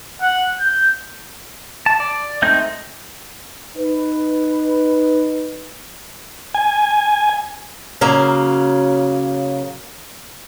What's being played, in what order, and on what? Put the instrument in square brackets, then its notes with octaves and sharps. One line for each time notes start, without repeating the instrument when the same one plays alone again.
[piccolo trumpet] F#5
G6
[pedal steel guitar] A5
D5
G#3 A3 C4 D#4 G6
[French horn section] D#4 B4
[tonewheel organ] G#5
[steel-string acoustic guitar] C#3 F#3 A#3